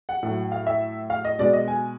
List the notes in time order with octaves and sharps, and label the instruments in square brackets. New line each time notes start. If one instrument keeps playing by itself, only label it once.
[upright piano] F#5
A2 F#3
F5
E5
F5
D#5
B2 G#3 D5
D#5
G#5